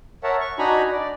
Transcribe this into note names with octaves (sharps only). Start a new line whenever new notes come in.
A#4 C#5 E5 F#5 A5
C#6
D4 D#4 F#4 G#5 A#5 B5
D5